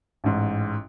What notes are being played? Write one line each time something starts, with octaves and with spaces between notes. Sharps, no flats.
A1 G#2